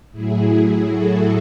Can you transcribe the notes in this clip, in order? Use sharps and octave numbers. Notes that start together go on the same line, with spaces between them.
A2 F#3 E4 G#4
F#4 A4